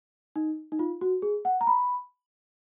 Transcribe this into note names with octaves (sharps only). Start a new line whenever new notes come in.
D#4
D#4
F4
F#4
G#4
F#5
A#5
B5